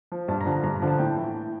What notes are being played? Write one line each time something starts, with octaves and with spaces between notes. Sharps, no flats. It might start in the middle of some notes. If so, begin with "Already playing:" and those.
F3
G2 A5
A#5
D3 F3
A#5
G2 A#5
D3 F3
A5
A2 G5
E3
A2